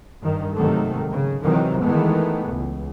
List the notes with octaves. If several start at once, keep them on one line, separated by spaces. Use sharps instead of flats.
G2 D#3
G#2 C3 D#3 F#3 A3
C#3
G#2 C3 D#3 E3 F#3
D#3 E3 G#3 A3 B3
C#2